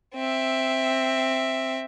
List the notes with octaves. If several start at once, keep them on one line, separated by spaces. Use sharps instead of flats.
C4 E5